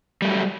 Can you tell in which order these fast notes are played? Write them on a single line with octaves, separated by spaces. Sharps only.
G3 A3 F#3